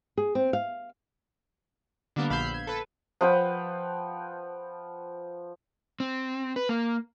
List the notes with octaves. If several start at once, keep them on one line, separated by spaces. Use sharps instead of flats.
G#4
C4
F5
D3 G3 A#3 B3
A#1 F5 B5 E6 G6 C7
G#6
A4 B4
F3 B4 F#5 G5
C4
B4
A#3